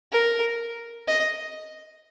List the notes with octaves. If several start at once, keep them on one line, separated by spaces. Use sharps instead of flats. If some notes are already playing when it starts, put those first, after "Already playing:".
A#4
D#5